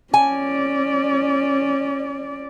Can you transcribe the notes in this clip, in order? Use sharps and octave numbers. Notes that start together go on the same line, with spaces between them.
C#4 D5 G#5